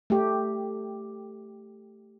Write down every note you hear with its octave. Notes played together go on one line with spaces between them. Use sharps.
A3 G4